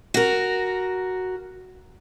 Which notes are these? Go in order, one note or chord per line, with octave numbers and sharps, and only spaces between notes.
F#4 A#4